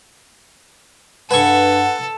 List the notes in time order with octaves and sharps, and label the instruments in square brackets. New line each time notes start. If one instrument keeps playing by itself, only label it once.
[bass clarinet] G2 [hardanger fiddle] A4 [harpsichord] B4 G#5 C#6 [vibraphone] F#5